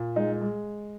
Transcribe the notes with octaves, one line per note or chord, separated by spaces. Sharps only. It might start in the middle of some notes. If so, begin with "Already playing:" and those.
Already playing: A#2
G#3 D#4
G#3